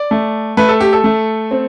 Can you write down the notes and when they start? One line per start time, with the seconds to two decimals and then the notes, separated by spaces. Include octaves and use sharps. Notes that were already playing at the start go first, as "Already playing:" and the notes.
Already playing: D5
0.11 A3
0.57 A3 B4
0.69 A4
0.80 G4
0.93 A4
1.04 A3
1.51 C4